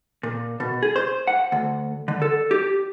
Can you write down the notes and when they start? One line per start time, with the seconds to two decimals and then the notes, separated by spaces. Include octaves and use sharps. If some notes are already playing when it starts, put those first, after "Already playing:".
0.23 A#2
0.60 B2
0.83 G#4
0.96 C5
1.27 F#5
1.52 D2
2.08 D3
2.22 A4
2.51 G4